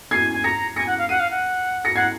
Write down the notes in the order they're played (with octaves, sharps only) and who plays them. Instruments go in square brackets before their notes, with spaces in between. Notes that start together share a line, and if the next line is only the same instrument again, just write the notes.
[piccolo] G#5 [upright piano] G#6 C7
[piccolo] G#5
[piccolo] A#5 [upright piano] A#6 C#7
[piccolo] G#5 [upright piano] A#6 C#7
[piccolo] F#5
F5
[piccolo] F#5 [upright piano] C7 D#7
[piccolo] F5
F#5
[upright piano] A#6 C#7
[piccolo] F#5 [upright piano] G#6 C7